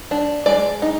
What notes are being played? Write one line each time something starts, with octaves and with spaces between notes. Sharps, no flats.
D4
G#3 D5
D#4